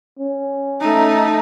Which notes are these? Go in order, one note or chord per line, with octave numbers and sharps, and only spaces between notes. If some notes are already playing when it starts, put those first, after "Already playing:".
C#4
A3 D#4